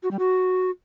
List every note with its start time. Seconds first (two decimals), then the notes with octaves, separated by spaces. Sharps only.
0.03 F#4
0.11 G3
0.19 F#4